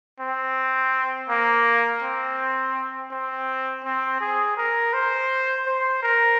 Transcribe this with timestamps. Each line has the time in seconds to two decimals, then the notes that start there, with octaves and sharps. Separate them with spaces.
0.20 C4
1.29 A#3
2.02 C4
3.11 C4
3.84 C4
4.20 G#4
4.57 A#4
4.93 C5
5.66 C5
6.03 A#4